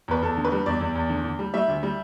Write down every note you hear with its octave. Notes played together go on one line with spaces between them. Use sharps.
E2 B4
E2 A4
D3
B4
G3
E2 D5
E2
E2
D3
D3
G3
G3 E5
D2
G3